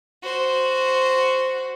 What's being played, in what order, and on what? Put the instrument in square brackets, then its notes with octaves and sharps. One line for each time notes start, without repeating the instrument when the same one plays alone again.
[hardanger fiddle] F#4 C5